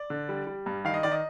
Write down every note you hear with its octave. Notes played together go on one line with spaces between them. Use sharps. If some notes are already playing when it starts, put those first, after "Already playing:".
Already playing: D5
D3
G3
G3
G2
D#3 F5
D#5
D#3 D5
D#5